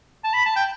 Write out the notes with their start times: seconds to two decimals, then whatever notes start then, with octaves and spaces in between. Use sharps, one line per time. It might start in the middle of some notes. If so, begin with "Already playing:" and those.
0.24 A5
0.33 B5
0.45 A5
0.56 G5